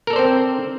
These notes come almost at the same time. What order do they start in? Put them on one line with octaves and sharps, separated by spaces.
A#4 A4 D5 C5 C4